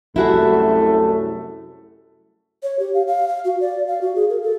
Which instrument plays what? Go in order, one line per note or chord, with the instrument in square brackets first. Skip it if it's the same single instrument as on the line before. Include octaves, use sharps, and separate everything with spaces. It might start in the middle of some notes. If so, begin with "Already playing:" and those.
[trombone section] C2 F#2 A3 [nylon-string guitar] E4 F#4 G#4
[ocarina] C#5
G4
F5
F5
F5
F#4
D5
F5
F#4
G#4
A#4
A4